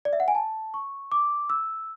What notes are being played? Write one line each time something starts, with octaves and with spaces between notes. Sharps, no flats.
D5
E5
F#5
G#5
A5
C#6
D6
E6